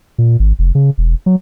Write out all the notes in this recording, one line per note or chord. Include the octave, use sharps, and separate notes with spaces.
A#2
G#1
F1
C#3
E1
F#3